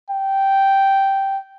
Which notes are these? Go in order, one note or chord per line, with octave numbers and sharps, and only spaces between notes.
G5